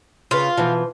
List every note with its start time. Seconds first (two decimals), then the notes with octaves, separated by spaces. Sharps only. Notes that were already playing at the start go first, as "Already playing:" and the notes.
0.31 C#3 F4 B4
0.57 B2 E3 F3